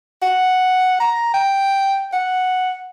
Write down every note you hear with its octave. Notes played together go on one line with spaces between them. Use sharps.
F#5
A#5
G5
F#5